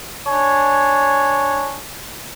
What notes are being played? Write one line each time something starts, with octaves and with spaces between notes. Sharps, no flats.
D4 C#5 G#5